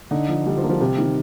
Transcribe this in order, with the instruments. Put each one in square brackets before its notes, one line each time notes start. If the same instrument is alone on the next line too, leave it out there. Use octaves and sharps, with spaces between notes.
[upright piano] D3 [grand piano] D#4
[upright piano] F3
[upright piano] D3 [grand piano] G3
[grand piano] F3
[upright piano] A#3
[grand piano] F3
[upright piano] C3 [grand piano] G3
[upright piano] D#3